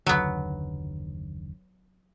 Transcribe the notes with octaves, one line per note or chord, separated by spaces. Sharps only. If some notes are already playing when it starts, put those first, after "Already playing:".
F#1 D#2 D3 F#3 B3